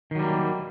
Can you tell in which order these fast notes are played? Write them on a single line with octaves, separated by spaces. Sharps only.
D#3 F#3 G3 A#3